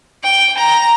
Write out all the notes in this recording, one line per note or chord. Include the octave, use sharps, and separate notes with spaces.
G5
A#5